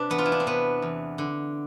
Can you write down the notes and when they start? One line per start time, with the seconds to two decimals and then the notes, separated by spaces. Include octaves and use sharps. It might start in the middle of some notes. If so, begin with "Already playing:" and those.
Already playing: C3 D4 B4
0.10 E2 B3
0.18 F4
0.26 E4
0.32 D4
0.40 C4
0.47 C3 B3
0.82 E2
1.18 D3